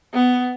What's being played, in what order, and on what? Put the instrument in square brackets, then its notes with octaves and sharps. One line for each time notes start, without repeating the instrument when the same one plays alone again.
[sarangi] B3